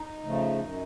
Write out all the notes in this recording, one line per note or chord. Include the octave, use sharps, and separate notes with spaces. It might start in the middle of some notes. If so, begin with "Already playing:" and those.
Already playing: D#4
C#3 F3 A3
F#2